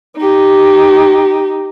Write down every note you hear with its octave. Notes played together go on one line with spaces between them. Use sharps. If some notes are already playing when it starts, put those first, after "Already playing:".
D#4 G4